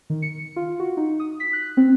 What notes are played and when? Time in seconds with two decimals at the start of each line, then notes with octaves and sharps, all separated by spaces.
0.10 D#3
0.22 C#7
0.56 F4
0.80 F#4
0.97 D#4
1.20 D#6
1.40 B6
1.53 F#6
1.77 C4